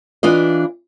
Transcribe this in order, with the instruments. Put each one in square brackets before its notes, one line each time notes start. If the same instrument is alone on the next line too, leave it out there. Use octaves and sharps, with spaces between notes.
[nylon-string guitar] E3 D4 F4 D#5